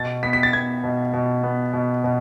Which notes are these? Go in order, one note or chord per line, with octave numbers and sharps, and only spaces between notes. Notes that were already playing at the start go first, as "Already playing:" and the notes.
Already playing: B2 A6
B3 B6
B6
A6
B3 G#6
B2
B2
B3
B2
B2